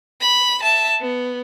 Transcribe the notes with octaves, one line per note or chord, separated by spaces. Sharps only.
B5
E5 A5
B3